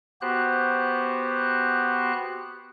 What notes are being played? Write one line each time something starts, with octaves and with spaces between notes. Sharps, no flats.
B3 F#4 G4 C5 F#6